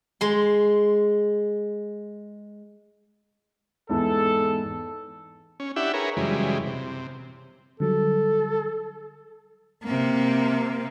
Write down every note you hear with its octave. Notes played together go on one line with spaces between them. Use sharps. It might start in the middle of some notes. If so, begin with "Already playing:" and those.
G#3 C6
E2 G#2 E3 A4
C#4
D4 E4 G4 E5 F#5
G#4 A#4 B4 C#5
F#2 C#3 E3 G3 G#3
C3
D3 F#3 G3 A4
C3 A#3